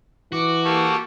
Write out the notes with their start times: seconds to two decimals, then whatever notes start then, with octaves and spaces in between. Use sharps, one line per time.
0.32 E3 F#4 D6
0.64 A#3 G4 A4 C#6